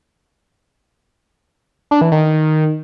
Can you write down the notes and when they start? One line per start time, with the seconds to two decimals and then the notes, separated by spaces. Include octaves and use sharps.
1.91 D4
2.01 E3
2.12 D#3